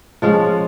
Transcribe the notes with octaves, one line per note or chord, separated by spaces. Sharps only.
F3 G#3 C#4